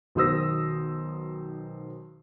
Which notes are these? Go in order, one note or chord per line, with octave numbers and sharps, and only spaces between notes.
B1 D#3 C5 D#6 E6 A#6